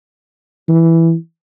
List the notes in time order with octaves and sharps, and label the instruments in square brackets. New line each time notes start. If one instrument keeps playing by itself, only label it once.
[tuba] E3